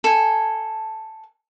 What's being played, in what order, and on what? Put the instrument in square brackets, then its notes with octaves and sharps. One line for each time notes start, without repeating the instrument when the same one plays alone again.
[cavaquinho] A4 G#5